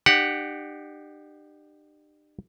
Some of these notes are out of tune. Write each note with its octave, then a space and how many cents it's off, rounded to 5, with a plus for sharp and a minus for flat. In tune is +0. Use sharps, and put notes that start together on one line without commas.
D4 +45 G4 +0 F#5 +0